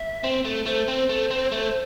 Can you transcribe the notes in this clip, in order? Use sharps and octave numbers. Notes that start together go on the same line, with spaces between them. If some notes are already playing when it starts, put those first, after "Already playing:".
Already playing: E5
C4
A3
A3 C5
C4
A3
C4
A3